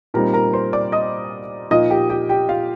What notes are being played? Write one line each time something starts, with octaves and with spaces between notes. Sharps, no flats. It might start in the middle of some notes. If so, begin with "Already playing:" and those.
A#2 G3 C4 D#4 A#4 A#5
A#4 A#5
C5 C6
D5 D6
D#5 D#6
A#2 F3 A#3 D#4 D#5 D#6
G4 G5
G4 G5
G4 G5
F4 F5